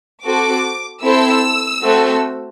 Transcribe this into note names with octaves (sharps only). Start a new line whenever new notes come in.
C4 F#4 A4 D6
C4 E4 A4 E6
A3 C4 F#4 A4